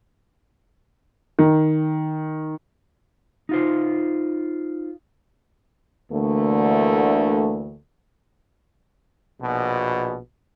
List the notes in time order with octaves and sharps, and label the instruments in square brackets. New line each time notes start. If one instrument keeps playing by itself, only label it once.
[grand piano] D#3
[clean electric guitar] D#4 F4 C5
[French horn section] D2 D3 E3 A3 A#3
[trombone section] A#1 B2